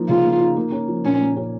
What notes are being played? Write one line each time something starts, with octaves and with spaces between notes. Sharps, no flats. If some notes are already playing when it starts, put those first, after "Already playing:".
Already playing: F3 A#3 D#4
C#3 F4
A#3
D#4
A#3
C#4
F3
A#2 C#4
A#3
C#4